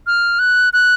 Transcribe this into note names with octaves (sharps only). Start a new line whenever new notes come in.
F6
F#6
F#6